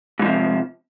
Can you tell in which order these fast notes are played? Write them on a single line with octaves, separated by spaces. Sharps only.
G#2 E3 F3 C3